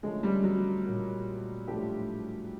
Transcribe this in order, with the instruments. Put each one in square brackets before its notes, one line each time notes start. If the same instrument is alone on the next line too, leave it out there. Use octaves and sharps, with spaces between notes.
[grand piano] D3 F3 A3 C#4 [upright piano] G#3
[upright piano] G3
F#3
[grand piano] A#2 F#3 A#3
A2 F3 A3 D4 G4